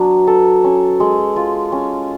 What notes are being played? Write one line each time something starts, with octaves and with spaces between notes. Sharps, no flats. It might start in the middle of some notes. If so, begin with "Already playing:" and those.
Already playing: F#3 B3 D4
A4
C#4
G#3
F4
C#4